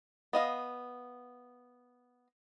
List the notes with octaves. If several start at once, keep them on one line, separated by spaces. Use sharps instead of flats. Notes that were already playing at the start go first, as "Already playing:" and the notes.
B3 D#5 F5